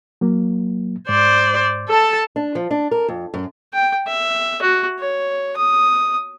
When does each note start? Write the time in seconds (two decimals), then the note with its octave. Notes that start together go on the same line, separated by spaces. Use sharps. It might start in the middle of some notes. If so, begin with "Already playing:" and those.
0.21 F#3 A#3
1.09 G#2 C5 D5
1.88 A4 A5
2.36 D4
2.55 F3
2.71 D4
2.91 A#4
3.08 F2
3.34 F#2
3.74 G5
4.07 E5
4.62 F#4
4.99 C#5
5.57 D#6